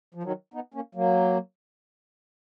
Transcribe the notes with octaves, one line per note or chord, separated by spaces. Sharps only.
F3
D#3 F#3
B3 D#4
A#3 C#4
F#3 A#3